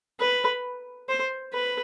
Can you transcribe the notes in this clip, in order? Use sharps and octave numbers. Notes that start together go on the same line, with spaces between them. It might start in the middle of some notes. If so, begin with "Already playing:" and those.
B4
C5
B4